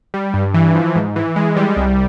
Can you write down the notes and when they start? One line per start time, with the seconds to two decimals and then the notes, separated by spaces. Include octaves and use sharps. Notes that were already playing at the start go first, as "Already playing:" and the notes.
0.14 G3
0.34 G2
0.54 E3
0.75 F3
0.96 G#2
1.16 E3
1.36 G#3
1.57 G3
1.76 C2